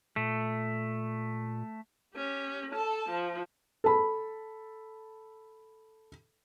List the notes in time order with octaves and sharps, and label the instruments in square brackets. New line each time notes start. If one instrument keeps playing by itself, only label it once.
[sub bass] A#2 [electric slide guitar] A3
[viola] C#4 G4
A4 A5
F3
[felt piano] A4 B5